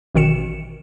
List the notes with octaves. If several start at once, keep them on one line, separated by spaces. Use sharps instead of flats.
A1 B2 D#3 C#7 E7